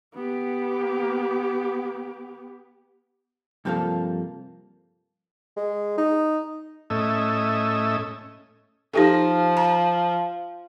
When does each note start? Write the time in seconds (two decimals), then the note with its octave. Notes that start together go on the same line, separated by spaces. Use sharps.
0.14 B3 G4
3.65 G2 C3 F3 A#3 A4 F5
5.57 G#3
5.98 D#4
6.90 A2 A3 C#4 D#5 E5
8.94 F3 D#4 G4 A4
9.57 A#5